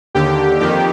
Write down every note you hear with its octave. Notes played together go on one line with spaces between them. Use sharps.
D#2 D3 G4
F2 D#3 G4